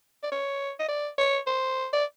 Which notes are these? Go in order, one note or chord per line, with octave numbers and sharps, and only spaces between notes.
D5
C#5
D#5
D5
C#5
C5
D5